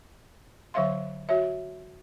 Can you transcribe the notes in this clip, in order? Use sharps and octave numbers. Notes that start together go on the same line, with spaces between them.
D3 F#3 C#5 E5 F5 C6
F#4 C#5 E5